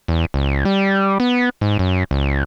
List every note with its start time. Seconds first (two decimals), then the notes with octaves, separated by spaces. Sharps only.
0.08 E2
0.34 C#2
0.65 G3
1.20 B3
1.61 G#2
1.79 F#2
2.11 C#2